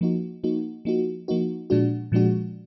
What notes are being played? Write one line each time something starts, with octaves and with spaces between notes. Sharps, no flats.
F3 A#3 D#4 F#4
F3 A#3 D#4 F#4
F3 A#3 D#4 F#4
F3 A#3 D#4 F#4
A#2 F3 G#3 D4 F#4
A#2 F3 G#3 D4 F#4